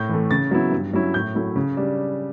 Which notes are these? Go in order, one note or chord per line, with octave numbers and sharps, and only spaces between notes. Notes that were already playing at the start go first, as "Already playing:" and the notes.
Already playing: A2 G6
E3 A3
C#3 A6
F#3 B3 E4
G2
F#3 C#4 E4
A2 G6
F#3 A3 E4
C#3
G3 D4